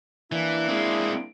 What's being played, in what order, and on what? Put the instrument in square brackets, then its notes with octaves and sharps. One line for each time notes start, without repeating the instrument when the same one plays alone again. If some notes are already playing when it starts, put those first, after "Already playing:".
[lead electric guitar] E3 [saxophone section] A#3 D4 E4
[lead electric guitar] G#3 C4